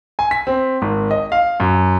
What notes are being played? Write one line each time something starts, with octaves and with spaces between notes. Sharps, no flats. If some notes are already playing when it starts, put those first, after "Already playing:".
G#5
B6
C4
G#1
D#5
F5
F#2